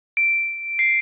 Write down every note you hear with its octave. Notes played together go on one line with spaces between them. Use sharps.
D7
C7